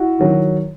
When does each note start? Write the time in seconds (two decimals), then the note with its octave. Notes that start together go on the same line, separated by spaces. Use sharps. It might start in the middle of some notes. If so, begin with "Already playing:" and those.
Already playing: E4 F#4
0.19 D#3 F#3